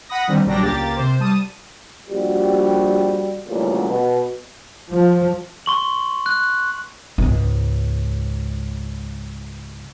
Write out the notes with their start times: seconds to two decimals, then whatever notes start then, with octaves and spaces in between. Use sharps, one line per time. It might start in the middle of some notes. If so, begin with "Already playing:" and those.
0.09 F#5 B5 D#6 A#6
0.28 D3 D#3 G3 C4
0.46 A#1 F#3 G3 D4 G5 A#6
0.63 C#2 A#3 G4 A6
0.96 C3 C5
1.20 G3 A5 D#6 D#7
2.09 A#1 G3 F#4 G4
3.47 A1 D2 A#2 C#3 F#3 G3
3.89 B2
4.93 F3
5.66 C6 C#6 F#7
6.26 F#6
7.18 C#2 G#2